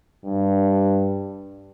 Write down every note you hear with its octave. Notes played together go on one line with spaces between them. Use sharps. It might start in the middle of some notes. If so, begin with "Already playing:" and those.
G2